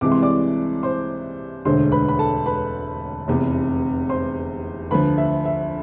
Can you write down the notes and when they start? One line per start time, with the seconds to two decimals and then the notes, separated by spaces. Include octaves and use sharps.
0.01 C2 C3 E3 G#3 D6
0.12 C6
0.22 D5 D6
0.83 C5 C6
1.65 E1 D2 D3 G#3 C5 C6
1.92 B4 B5
2.08 B5
2.19 A4 A5
2.46 B4 B5
3.28 F1 E2 C3
4.09 C5 C6
4.91 D2 D3 F3 B4 B5
5.18 E5
5.45 E5